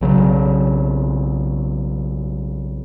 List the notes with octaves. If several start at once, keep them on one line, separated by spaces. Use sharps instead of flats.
B1 C#3 F#3